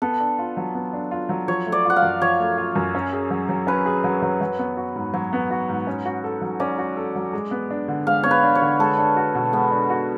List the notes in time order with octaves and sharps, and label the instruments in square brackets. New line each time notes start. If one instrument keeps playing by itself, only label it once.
[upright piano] B3 [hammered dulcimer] A4
[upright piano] D4
F4
F#3
B3
D4
F4
F#3
[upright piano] F3 [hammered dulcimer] C#5
[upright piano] A3
[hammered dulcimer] D5
[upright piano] F4 [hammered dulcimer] F#5
[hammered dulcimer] F5
[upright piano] F#2
[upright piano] F3 [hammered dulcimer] C#5
[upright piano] A3
F4
F#2
C#4
G#4
F#3
F#3
[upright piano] C#4 [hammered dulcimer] B4
[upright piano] G#4
F#3
F#3
F#3
B3
F#4
G#2
[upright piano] F#3 [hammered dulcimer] C#5
[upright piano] B3
F#4
G#2
C#4
F#4
A4
F#3
[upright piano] C#4 [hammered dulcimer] D5
[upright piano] F#4
A4
F#3
G#3
B3
D4
D3
[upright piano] G#3 [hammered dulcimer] F5
[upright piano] B3 [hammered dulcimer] C#5
[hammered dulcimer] B4
[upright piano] D4
[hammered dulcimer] C#5
[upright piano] D3
[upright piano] G#3 [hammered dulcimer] A4
[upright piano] D4
F#4
B2
[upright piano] G#3 [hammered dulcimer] B3
[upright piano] D4
F#4